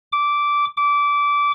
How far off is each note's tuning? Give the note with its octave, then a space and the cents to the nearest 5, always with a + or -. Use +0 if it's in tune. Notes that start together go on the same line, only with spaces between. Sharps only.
D6 -10
D6 -20